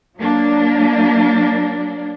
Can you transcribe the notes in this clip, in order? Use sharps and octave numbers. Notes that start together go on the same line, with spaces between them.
F#3 A#3 D4